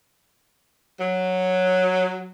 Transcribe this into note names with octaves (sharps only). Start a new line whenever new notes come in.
F#3